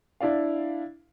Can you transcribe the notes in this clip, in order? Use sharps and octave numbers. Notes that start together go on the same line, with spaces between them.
D4 E4 D5 F5